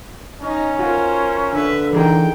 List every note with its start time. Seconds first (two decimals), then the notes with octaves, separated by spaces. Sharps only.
0.41 C#4 D#4 D#5
0.79 F4 F#4 A#4 C5
1.52 D3 B4 E5
1.93 E3 D#4 G#4 A#4 G5